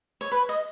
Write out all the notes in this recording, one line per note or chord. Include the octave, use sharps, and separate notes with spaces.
C#5
B4
D#5